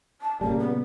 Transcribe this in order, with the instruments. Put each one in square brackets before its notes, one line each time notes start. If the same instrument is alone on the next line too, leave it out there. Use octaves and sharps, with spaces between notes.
[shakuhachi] A5
[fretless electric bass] A#2 C#3 G3 [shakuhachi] A#3
[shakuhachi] B3